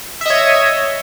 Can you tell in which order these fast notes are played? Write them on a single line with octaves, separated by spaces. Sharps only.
E5 D#5 C#5